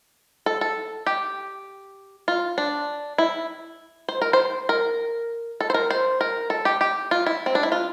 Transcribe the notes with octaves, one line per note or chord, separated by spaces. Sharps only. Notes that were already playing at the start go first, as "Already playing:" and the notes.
A4
A4
G4
F4
D4
E4
C5
A#4
C5
A#4
A4
C5
A#4
C5
A#4
A4
G4
G4
F4
E4
C4
D4
E4
F4